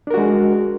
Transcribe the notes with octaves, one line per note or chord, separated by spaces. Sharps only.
G#3 D4 F#4 A#4